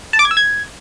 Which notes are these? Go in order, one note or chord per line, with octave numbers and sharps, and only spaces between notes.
A5
D6
G#6
E6
G#6